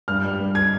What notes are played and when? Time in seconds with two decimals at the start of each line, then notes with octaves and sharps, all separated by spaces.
0.08 G2 F6
0.24 G3
0.40 G2
0.55 G#6